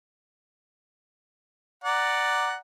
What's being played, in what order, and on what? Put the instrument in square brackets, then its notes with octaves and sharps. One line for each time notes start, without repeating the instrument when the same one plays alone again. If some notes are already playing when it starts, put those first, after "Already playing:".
[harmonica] D5 F#5 A#5